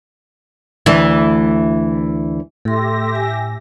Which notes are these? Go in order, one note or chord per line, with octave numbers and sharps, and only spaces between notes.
D2 E3
A2 G4 A4 E5 C6 A#6
G#5